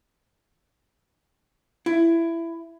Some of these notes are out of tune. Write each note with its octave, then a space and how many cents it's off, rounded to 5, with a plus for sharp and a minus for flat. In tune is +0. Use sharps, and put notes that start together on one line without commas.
E4 +15